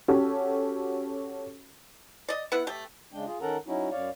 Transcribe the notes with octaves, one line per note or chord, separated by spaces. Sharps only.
C#4 F#4 G4 A4 C#5
D5 D#5
B3 E4 F#5
A3 G4
C#3 G#3 D4 G5
F4 G#4
D#3 C#4 A4 A#4 F#5 A#5
F#3 C#4 D#4 E4 F#4
F#2 C#5 D5 F5